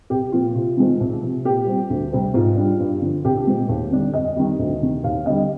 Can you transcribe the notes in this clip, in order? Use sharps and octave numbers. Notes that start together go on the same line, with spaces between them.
C2 G4
A#2 F3 C4 F4
C3 F4
D#3 G#3 C4
C2
C3 F3
A#2 G4
G3 C4
D2
C3 G3 C4
G#2 F4
G3 D4
G2
D3 F3
C2 G4
A#2 G#3 C4
D#2
D3 G3 D4
F2 D#5
D#3 G3
D2
C3 D#3
D#2 F5
D3 G3 D#5